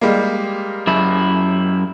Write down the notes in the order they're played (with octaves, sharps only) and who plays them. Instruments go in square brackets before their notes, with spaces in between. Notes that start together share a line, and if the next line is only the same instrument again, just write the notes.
[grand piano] G3 G#3 A#3
[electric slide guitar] F#2 E4